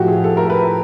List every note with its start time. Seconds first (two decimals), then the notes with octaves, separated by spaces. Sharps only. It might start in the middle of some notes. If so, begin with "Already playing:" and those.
Already playing: A2 F3 F#4 G4
0.08 G#4
0.24 A4
0.37 A#4
0.50 B4